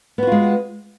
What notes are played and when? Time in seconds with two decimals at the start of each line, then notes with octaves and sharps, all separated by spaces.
0.18 B3
0.23 F#4
0.27 F4
0.32 G#3